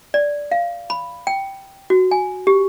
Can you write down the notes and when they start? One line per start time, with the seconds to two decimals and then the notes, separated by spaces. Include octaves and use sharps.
0.14 D5
0.52 F5
0.90 B5
1.27 G5
1.90 F#4
2.11 G#5
2.47 G4